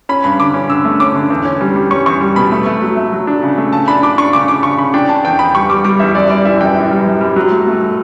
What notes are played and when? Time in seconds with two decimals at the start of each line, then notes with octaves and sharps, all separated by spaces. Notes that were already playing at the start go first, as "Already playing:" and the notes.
0.09 C#4 B5
0.24 G2 B5
0.40 D3 D6
0.54 C#4
0.69 D3 E6
0.85 A3
1.00 C#4 D6
1.15 D3
1.30 E2
1.45 C#4
1.61 G3
1.76 G3
1.91 C#4 C#6
2.06 E2 C#6
2.21 G3
2.36 B2 B5
2.52 A3
2.66 A3
2.82 F#3
2.97 A3
3.12 F#3
3.27 D4
3.42 C#3
3.58 A3
3.73 C#3 A5
3.88 D4 B5
4.02 D4 D6
4.18 D4 C#6
4.33 C#3 D6
4.48 D4 D6
4.63 C#3 C#6
4.79 C#3 B5
4.94 D4 G5
5.09 D4 A5
5.25 E2 G5
5.39 E2 B5
5.54 G3 C#6
5.69 G3 D6
5.85 G3 D6
6.00 E2 E5
6.15 F#2 D5
6.30 G3 D5
6.45 E3 E5
6.61 F#2 G5
6.76 E3
6.91 G3
7.06 F#2
7.21 G3
7.36 F#3
7.51 A3
7.67 A3
7.81 A3